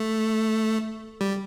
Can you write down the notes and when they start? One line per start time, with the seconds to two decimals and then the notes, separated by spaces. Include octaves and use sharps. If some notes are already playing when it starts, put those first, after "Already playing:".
Already playing: A3
1.21 G3